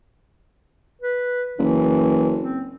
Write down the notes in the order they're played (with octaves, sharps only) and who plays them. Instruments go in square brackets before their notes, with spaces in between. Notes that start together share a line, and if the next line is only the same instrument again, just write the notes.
[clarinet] B4
[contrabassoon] F#1 [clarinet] E3
[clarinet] C4